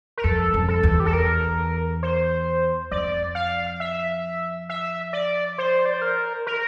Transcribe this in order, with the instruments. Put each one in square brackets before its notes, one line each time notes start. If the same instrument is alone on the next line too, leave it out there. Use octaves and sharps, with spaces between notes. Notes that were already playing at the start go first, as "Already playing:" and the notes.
[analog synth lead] A#4
[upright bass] F2 [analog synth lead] A4
[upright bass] F2
[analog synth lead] A4
[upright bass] E2
[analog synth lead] G4
A4
A#4
C5
[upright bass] F2 [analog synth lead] D5
[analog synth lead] F5
E5
E5
D5
C5
D5
C5
A#4
A#4